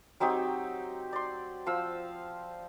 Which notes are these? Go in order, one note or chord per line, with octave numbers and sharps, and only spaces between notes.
F#3 C4 D#4 G4
D5 C6
F3 F5 E6